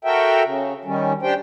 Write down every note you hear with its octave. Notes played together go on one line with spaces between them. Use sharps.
F#4 A4 A#4 E5 G5
C#3
D#3 G3 C#4
D4 G4 C5 G5